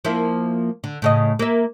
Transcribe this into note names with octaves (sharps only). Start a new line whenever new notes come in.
F3 A#3 E4
D3
A2 C#3 D#5
A#3 E5